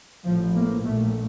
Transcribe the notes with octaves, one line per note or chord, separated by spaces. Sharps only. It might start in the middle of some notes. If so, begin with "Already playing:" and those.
A1 A2 F3
A#3
A#1 A#2 A3